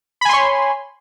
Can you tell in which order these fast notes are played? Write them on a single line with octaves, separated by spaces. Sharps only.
B5 G#5 C6 C#5